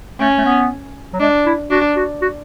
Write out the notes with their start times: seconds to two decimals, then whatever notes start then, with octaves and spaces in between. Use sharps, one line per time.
0.20 A3 C#4
0.38 A3
0.45 B3
1.13 F#3
1.20 G#3 D4
1.46 E4
1.70 D4 F#4
1.96 F#4
2.22 F#4